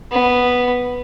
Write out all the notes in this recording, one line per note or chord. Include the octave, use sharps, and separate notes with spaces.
B3